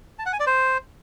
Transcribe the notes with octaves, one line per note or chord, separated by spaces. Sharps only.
A5
F#5
G#5
D5
C5